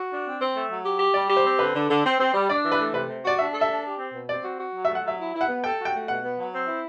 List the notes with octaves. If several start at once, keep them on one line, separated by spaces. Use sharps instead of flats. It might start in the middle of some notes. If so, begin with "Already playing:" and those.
Already playing: F#4
D4
C4
C4
A3
F#3
G4
G4
G3 D5
G4
C5
C4
D3 B4
D3
D3
C4
C4
G3
D4 D5
E3
B4
A3
C3 B4
C3
F#4 D5
D4 E5
A4
E5
D4
G4
C4
B2
C4 D5
F#4
F#4
F#3
E5
A3
F#5
F#3 E5
E4
E4
F#5
B3
A4 G5
F#4
G5
A3
B2 F#5
B3
F#3
C4
E4